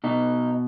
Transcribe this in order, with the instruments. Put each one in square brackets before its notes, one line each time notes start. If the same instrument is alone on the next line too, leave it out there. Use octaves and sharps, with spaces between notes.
[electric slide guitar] B2 D#4